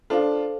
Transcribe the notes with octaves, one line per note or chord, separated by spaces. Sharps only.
D4 F4 A4 C5 F5